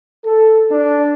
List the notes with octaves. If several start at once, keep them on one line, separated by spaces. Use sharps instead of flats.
A4
D4